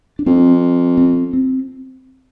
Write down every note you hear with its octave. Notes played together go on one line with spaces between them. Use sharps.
D4
F2 C4
C4
C4